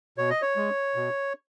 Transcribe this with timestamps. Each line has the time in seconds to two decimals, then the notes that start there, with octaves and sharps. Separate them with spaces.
0.18 B2 C#5
0.30 D#5
0.42 C#5
0.56 G#3
0.96 B2